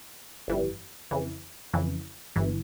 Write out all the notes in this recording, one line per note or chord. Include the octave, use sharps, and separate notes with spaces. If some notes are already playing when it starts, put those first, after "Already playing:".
G1 F2 E3 G3
F2 C#3 E3
F2 C#3 E3
G1 G2 E3